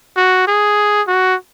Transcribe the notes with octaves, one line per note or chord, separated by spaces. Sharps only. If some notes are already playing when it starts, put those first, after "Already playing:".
F#4
G#4
F#4